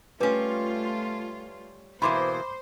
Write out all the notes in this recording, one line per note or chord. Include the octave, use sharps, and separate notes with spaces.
G3 A3 C#4 F4 B4
B2 E3 A#3 C5 B5 C6 D6